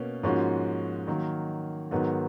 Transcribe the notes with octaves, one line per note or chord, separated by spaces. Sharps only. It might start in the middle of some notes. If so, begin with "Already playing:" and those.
Already playing: B2 A#3 C#4
G#2 F3 A#3 C#4 F#4
D#3 F#3 A#3
G#2 D#3 F#3 B3